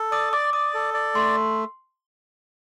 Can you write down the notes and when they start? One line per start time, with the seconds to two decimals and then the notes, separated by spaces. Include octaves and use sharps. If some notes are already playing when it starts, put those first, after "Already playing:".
Already playing: A4
0.12 D5 D#6
0.33 D5 D6
0.53 D5 D#6
0.74 A4
0.94 D5
1.15 A3 C6